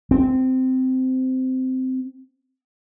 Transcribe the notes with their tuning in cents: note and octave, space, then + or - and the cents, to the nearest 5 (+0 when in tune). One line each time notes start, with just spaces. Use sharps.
C4 -15